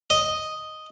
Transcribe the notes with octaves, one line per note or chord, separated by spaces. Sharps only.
D#5